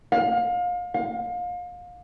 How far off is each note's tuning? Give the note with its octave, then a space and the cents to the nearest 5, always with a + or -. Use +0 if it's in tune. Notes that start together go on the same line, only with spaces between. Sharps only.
F5 +30
F5 +30